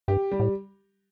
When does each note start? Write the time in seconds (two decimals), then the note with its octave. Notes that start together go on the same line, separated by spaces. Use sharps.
0.08 G2 G4
0.31 G3
0.40 A2